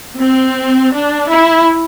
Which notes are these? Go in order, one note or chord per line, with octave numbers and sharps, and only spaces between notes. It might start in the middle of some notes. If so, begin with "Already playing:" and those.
C4
D4
E4